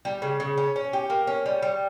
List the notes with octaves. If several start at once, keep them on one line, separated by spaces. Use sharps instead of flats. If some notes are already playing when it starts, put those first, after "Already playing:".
G3
C#3
C#3
C#4
C#4
G4
A#3
C#4
G3
G3